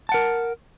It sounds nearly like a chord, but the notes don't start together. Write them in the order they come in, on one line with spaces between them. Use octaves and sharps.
A5 F#5 A#4